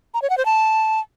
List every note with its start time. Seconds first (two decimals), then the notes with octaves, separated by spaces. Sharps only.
0.14 A#5
0.22 C#5
0.30 F#5
0.38 C5
0.46 A5